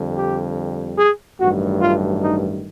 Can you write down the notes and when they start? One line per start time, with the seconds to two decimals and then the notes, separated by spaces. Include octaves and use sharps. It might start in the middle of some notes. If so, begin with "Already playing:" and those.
Already playing: F2 D3 G3
0.16 G4
0.98 G#4
1.40 A1 G2 D#3 F#3 A3 F#4
1.82 F4
2.23 D#4